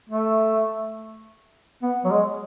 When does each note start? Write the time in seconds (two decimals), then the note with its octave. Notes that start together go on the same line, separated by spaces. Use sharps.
0.10 A3
1.83 B3
2.04 F#3
2.11 G#3